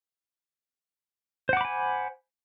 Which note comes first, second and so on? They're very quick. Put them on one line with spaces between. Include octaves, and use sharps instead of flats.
C5 F#5 D6 B5 G#5